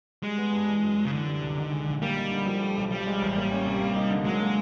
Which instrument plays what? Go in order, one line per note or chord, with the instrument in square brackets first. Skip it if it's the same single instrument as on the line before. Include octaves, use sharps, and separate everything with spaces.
[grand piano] G3 [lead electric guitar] G#3
[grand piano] B3
G2
E3
F#2
F#2
[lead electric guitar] C#3
[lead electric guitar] D3 [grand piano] E3
[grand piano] G3
C2
D#3
G#3
A#1
[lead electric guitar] G3 [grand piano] A#3
[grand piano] D#4
D3
F3
A3
B1
[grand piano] F3 [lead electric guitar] G3
[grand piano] G#3
A1
A#3
C#4
C3
A#3
D#4
D3
[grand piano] F#3 [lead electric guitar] G#3
[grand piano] A#3